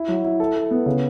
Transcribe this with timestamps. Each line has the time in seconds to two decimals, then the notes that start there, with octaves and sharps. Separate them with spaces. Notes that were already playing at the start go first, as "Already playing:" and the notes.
Already playing: E4
0.08 F#3
0.24 E4
0.40 A4
0.56 A4
0.71 B3
0.86 C#3